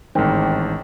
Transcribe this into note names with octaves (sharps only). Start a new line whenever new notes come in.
A1 G#2 D#3 C4